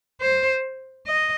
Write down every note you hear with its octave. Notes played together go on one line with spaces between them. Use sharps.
C5
D#5